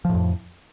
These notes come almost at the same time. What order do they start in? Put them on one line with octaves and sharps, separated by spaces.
F3 A2 F2